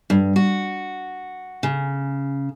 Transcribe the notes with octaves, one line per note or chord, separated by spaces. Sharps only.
G2
F#4
C#3